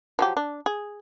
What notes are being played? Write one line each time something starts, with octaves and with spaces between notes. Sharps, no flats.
F3 F#3 G4
D4
G#4